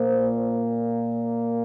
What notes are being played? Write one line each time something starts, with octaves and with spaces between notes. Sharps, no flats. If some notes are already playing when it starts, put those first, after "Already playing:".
Already playing: A#2 A#3 C5